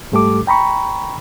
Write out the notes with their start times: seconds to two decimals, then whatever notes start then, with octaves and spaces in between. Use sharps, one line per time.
0.12 G#2 G3 A3 G4 A4 D6
0.47 G5 A#5 B5 C#6